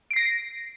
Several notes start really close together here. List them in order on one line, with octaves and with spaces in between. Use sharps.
D7 C7 A#6